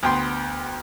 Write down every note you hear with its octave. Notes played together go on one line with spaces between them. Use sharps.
D2 B3 G5 C6